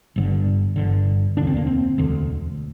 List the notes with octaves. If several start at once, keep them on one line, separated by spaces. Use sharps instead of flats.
G1 G2 D3
G1 G2 D3
E1 D2 D3 D4
C4
A#3
C4
E1 D2 D3